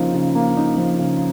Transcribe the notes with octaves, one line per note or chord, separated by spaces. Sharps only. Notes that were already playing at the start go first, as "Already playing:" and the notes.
Already playing: C#3 F3 A#3 D#4
C#3
A#3
D#4
F3
C#3